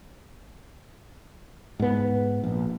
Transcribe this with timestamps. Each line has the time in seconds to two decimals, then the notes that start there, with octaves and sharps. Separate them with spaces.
1.80 G#2 B3
2.44 A#1